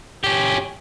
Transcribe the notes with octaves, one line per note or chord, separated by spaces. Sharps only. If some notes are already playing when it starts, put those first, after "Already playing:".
C#4 G4